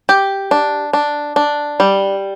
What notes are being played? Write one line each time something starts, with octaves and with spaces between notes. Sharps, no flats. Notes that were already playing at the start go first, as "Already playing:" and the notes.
G4
D4
D4
D4
G3